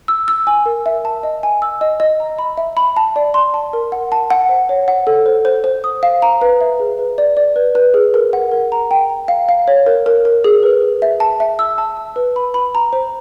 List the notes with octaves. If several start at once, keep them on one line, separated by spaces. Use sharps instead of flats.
E6
E6
G#5
A#4
E5
A5
D#5
G#5
E6
D#5
D#5
A#5
B5
E5
B5
A5
D5
C6
A5
A#4
F#5
A5
F#5
C5
C#5
F#5
A4
C5
C5
C5
D#6
F5
A#5
B4
E5
G#4
B4
D5
D5
B4
B4
G#4
A#4
F#5
A#4
A#5
G5
A#5
F5
F5
C#5
A#4
A#4
A#4
G#4
B4
G#4
E5
A5
E5
E6
A5
E6
B4
B5
B5
A#5
C5